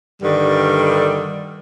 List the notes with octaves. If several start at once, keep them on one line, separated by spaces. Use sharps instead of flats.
G2 D3 D#3 G3